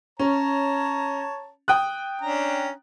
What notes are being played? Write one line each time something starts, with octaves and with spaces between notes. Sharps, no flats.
C#4 C#5 A5 A#5
G5 D#6 F#6
C#4 D4 A#5